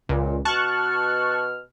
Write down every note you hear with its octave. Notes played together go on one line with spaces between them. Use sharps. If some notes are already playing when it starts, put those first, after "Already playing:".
C#2 A#2
B2 A5 C#6 F6 F#6